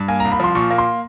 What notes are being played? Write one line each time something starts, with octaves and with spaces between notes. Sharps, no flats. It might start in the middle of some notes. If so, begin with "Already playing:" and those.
Already playing: G2
A#3 G#5
C2 A#5
B5
F3 C6
A#2 C#6
A#3
C6